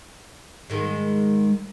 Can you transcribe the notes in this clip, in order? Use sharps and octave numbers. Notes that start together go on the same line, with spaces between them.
G#2 D#3 G#3